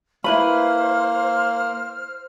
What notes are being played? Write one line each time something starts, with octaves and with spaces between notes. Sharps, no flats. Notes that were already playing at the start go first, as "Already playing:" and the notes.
A#3 E4 B4 C5 B5 F6